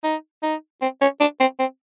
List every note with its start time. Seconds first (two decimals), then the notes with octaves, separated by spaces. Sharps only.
0.04 D#4
0.43 D#4
0.82 C4
1.02 C#4
1.20 D4
1.40 C4
1.59 C4